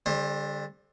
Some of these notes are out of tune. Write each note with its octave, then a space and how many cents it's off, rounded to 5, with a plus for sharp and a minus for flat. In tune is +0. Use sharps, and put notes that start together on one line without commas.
D3 -5 G3 +40 C5 +40